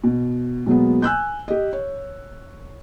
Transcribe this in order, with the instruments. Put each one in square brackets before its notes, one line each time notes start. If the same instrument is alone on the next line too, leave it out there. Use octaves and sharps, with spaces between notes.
[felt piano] B2
B2 F#3 G#3 A#3 B3
G#5 E6 F#6 G6
G4 D#5
C#5